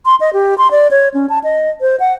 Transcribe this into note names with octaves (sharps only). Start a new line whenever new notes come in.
C6
D#5
G4
C6
D5
C#5
C#4
A5
D#5
C5
F#5